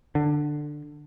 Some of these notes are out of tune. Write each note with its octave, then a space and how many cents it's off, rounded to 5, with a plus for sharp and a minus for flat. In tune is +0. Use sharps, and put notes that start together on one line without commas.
D3 +15